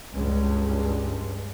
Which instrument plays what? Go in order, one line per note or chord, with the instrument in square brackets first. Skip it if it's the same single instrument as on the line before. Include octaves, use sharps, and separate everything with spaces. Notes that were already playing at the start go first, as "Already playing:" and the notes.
[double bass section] C#2 G2